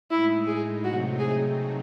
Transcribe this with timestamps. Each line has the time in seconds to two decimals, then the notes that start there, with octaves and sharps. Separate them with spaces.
0.11 A2 G#3 D#4 E4
0.47 G#4
0.84 C3 F#3 A3 C4 D#4 F#4
1.20 G#4